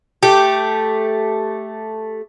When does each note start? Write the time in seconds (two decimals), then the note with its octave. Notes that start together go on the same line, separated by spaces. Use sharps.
0.23 A3 G4